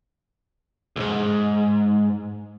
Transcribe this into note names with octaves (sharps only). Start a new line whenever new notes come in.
B1 G#2